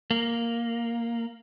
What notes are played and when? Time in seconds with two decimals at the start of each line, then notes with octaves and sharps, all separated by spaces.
0.11 A#3